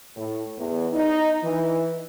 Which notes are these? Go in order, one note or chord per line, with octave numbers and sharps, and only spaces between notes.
A2
E2
D#4
E3